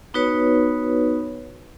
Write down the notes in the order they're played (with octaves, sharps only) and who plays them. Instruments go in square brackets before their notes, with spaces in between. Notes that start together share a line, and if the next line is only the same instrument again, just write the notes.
[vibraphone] B3 D#4 F#4 B4 C#5